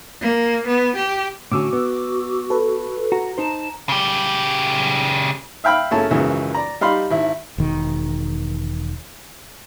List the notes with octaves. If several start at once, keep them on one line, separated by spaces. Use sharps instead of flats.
A#3
B3
G4
A2 D3 C#4 F#4 D6 E6
B3
A4 B4
F#4 A#5
D#4 C5 A5
C#3 G4
E5 F5 G5 B5 F6
F#2 C#3 A3 C#4 E4 A5
G#1 C#2 F#2 E3 G#3
D5 A#5
G3 D#4 G4 F5 B5 C6
G#1 E4 E5
E1 D#3